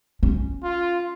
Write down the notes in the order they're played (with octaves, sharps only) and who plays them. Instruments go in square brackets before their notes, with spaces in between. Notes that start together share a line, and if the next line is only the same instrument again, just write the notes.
[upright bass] C#4
[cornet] F4